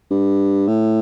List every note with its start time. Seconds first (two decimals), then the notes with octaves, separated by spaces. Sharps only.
0.10 G2
0.68 A2